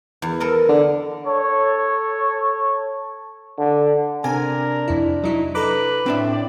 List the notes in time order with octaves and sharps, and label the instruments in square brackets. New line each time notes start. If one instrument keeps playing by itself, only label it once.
[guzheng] E2
A4 A#4 D#5
[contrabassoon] D3
[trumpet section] A4 C#5
[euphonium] D3
[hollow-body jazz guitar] C3 [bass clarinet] D4 [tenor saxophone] A#4 [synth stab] G#5
[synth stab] F2 E4
[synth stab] F#3 E4 [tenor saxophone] D#4
[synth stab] A4 A#5 D6 [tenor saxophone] B4
[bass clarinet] A2 [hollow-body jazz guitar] C4 D4 E5
[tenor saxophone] D5